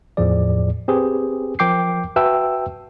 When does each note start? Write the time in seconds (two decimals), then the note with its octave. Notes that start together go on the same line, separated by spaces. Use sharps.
0.17 E2 A2 F3 G#4 D5
0.88 C4 G4 G#4 B4
1.59 F3 A#4 G5 D6 G6 C7
2.16 F#4 B4 E5 G5 A5 E6